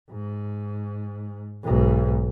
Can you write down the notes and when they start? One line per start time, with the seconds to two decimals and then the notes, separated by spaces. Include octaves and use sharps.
0.11 G#2
1.64 B1 G#2